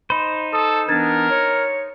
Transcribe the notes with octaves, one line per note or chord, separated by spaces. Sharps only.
D#4 C5 B5
A4 D#6
E3 B3 D4 A#4 G#6 A6
C#5